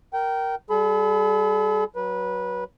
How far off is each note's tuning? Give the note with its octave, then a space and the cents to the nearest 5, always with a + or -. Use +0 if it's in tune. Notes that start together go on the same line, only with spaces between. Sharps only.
A#4 +0 G5 -20
G3 +0 A4 -45 B5 +25
F#3 +10 B4 -20